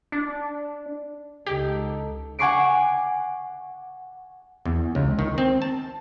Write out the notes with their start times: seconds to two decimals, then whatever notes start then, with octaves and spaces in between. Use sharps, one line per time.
0.12 D4
1.47 C#2 D#4 G4 A4
2.39 F#5 G#5 C#6 D6 C7 D7
4.65 E2
4.95 C#2
5.19 D#3
5.38 C4
5.62 A5